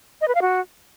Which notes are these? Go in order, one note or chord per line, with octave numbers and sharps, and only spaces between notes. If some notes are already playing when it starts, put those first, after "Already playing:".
D#5
B4
F5
F#4